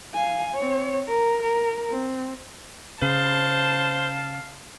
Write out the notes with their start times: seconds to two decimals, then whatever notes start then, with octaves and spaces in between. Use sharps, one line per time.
0.14 F5 G#5
0.55 C4 C#5
1.08 A#4
1.43 A#4
1.90 C4
3.02 C#3 C5 F5 A5